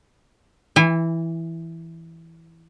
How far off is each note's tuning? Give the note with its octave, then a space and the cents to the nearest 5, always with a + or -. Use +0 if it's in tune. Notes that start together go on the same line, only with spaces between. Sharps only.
E3 +0 G#5 -35